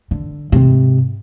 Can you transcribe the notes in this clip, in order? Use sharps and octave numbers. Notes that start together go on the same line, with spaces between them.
D3
G#2 C3